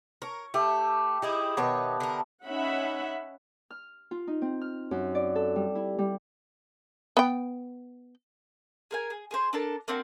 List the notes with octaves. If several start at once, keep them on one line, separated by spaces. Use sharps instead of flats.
A#4 C#5
A3 G4 E5
D#4 E4 G4 G#4
B2 D#3 B3 C#5 A5
D3 A#4
C#4 D#4 E5 F#5 B5
F6
F4
D#4
C4
F6
F#2
D5
A4
G3
E4
G3
B3 G5
G#4 A#4 G#5
G#4
G#4 A#4 C5
D4 A4 A#4 A5
A#3 C4 D4 F#4